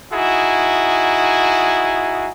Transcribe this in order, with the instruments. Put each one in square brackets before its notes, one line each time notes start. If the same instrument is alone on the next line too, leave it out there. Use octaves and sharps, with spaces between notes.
[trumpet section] D#4 E4 F#4 G#4